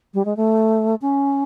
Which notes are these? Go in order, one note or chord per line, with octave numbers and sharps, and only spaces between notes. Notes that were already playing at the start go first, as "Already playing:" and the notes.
G3
G#3
A3
C#4